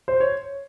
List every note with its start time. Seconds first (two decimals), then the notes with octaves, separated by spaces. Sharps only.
0.08 C5
0.20 C#5